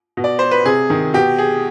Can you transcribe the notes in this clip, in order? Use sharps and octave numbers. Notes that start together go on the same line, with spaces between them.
B2
D5
C5
B4
C3 G#4
D#3
B2 G4
G#4